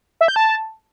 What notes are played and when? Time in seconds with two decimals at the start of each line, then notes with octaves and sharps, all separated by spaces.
0.21 E5
0.28 G6
0.36 A5